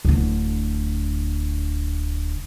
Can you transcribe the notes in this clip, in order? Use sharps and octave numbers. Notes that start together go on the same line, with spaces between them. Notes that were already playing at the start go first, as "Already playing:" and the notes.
D1 D3